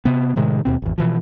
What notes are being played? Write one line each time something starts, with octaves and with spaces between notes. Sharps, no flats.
C3 B3
A2 C3 D#3 G#3
D#2 B2 C4
G#1 E2
B2 E3 F3